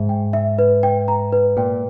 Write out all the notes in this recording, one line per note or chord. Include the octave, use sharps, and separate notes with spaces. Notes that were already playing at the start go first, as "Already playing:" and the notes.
Already playing: G#2 E5
G5
E5
B4
G5
A#5
B4
A#2 G5